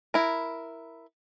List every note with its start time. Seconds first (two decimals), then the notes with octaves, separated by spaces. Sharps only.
0.14 E4 A#4